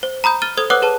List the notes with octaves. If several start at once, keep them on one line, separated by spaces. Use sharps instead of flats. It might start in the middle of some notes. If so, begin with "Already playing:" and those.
C5
A#5 B5 D#6 G6
F6 A6 D#7 G7
A4 C5 D#6 G#6
B4 C#5 F#5 D6 D#6 F#6
G#4 B4 A5